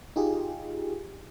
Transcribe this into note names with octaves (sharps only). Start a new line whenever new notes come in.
D#4 F4 G4 G#4